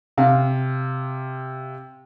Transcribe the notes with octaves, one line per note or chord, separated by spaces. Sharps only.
C3 F5